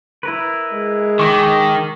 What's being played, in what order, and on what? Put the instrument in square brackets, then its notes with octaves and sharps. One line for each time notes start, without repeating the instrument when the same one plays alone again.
[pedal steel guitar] E4 A#4 B4
[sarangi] G#3
[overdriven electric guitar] D#3 [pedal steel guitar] C#6 D6